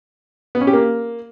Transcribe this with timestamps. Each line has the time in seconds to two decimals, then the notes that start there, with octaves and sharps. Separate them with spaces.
0.55 B3
0.61 C#4
0.67 G4
0.73 A#3